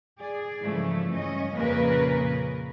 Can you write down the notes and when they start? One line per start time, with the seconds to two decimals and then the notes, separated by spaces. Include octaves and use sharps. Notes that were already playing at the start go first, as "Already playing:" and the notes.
0.19 G#4 D5
0.62 G#2 C#3 E3 F3 A3
1.13 G2 C#4 D#5
1.56 F2 A#2 C#3 A#3 A#4 B4